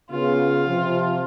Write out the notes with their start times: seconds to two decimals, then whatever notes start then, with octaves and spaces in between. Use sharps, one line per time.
0.11 C#3 B3 F4
0.67 C3 F3